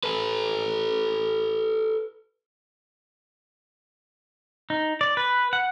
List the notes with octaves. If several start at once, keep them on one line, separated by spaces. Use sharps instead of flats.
A4 B4
D#4
D5
B4
F#5